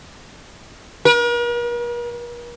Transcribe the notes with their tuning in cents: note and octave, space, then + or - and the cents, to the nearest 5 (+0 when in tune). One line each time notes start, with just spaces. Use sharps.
A#4 +45